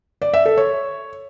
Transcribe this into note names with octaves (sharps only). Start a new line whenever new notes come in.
D5
E5
A4
C#5